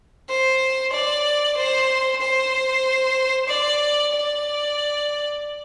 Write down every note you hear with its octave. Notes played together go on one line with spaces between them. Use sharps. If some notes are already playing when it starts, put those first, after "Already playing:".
C5
D5
C5
C5
D5
D5